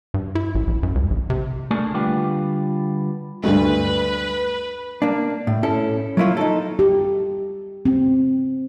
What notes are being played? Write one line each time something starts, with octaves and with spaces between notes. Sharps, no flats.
G2
E4
A1
A#1
F#2
C#2
A#1
C3
A3 A#3 D4 G#4
D3 G3 D4 F4 B4 G5
D2 G2 A3 B4
A#3 D4
A2
C#4 E4 A4
F#3 A#3 E4 F4 C#5
D#4 A4
G4
C4